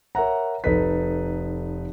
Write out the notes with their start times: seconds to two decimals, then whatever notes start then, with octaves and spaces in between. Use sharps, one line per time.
0.15 A#4 C#5 E5 F#5 A#5
0.64 F1 D#4 A4 B4 B6